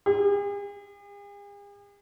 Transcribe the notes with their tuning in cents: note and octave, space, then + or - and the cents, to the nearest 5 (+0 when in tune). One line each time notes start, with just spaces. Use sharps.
G#4 -45